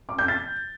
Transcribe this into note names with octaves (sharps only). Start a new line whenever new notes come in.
D6
G6
A6